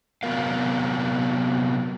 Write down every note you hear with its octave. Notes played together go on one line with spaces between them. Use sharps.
C3 F#3 B3 A#4 F5